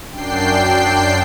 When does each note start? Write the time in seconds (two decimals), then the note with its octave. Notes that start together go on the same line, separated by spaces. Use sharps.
0.12 F#2 D4 G5 C7